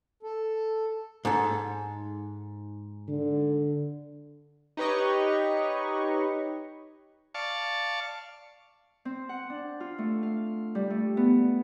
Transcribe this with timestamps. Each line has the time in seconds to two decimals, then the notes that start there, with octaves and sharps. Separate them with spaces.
0.23 A4
1.25 G#2 A4
3.08 D3
4.77 D#4 G4 B4 C#5 D#5 C#6
7.35 D5 F5 A5 C#6
9.05 C4
9.29 F#5
9.50 D4
9.80 F4
9.98 A3
10.23 F5
10.75 G3
10.90 A3
11.17 B3